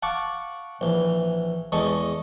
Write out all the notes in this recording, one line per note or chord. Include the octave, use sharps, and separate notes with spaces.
F5 F#5 A5 C#6 D6
A#1 E3
E2 G#3 A4 C#6